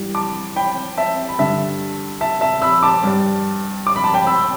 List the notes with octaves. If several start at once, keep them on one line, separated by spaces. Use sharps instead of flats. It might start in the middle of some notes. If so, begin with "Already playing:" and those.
Already playing: G2 E3 G3
A5 D6
G5 B5
E5 A5
B5
G2 D3 G3 E5 A5
E5 A5
E5 A5
B5 E6
A5 D6
G2 G3
D6
B5
A5
G5 B5
B5 E6